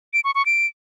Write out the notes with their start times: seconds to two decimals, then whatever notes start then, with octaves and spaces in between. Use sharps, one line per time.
0.14 D7
0.24 C#6
0.35 C#6
0.46 D7